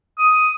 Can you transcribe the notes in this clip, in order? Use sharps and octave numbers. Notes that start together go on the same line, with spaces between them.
D#6